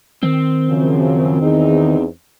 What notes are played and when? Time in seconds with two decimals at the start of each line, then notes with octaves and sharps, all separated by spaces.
0.23 D#3 C4
0.69 F#2 C#3 F3
1.42 E2 D#4 G#4